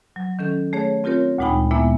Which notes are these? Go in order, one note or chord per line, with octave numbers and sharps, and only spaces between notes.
F#3
D#3 C#4 A4
A3 G#4 C#5
C4 F4 G4 A#4 C#5
D2 A#2 G#3 D#4 G5 B5
A#2 G#3 A#3 B3 E4 E5